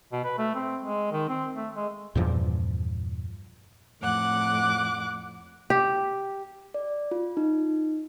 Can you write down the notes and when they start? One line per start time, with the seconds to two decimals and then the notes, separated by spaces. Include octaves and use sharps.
0.12 B2
0.24 B4
0.38 A3
0.55 C4
0.82 G#3
1.12 D#3
1.28 C4
1.56 A3
1.76 G#3
2.15 E2 G2 A#2 F3
4.02 F2 A2 F#5 D6 F#6
5.70 G4
6.74 D5
7.11 F4
7.37 D#4